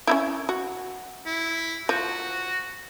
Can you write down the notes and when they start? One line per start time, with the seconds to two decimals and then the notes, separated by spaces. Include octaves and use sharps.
0.07 C#4 D#4 E4
0.49 F#4
1.26 E4
1.89 F3 F#4